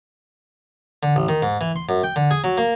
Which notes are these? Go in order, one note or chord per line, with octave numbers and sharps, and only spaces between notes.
D3
A1
D#3
G#2
E3
C6
F#2
G5
D3
G#4
F#3
A#3